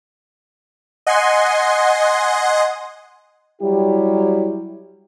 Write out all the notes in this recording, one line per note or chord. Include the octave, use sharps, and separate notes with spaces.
D#5 F#5 G#5 C6
F#3 G3 E4 G4